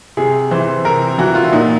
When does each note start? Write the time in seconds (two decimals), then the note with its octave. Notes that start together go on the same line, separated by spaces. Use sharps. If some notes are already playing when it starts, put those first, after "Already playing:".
0.17 C3 G#4
0.51 E3 C5
0.85 C3 A#4
1.18 E3 F#4
1.35 F4
1.43 E4
1.52 A#2 D#4